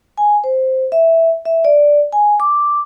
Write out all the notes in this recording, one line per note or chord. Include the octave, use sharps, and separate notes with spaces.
G#5
C5
E5
E5
D5
G#5
D6